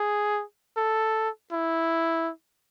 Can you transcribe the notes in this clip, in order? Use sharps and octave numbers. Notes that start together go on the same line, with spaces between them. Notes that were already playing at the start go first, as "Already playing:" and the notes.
Already playing: G#4
A4
E4